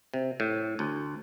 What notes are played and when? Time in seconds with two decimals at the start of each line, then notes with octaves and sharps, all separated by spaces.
0.14 C3
0.40 A2
0.79 D2